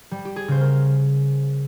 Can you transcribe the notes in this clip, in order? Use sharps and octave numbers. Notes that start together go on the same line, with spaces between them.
G3
G4
G#4
C#3 C5
A#4